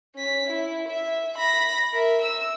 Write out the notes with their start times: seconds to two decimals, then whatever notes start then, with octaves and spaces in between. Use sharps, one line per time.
0.15 C#4 B6
0.47 E4
0.88 E5
1.37 B5 A#6
1.92 A#4 E5
2.21 E6 E7